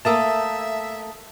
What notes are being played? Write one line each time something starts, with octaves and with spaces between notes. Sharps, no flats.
A3 A#3 A4 E5 A5 D#6 E6